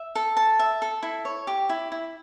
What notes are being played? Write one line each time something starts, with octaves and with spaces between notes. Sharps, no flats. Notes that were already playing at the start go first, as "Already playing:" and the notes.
Already playing: E5
A4
A5
E5
A4
E4
C#5
G4
E4
E4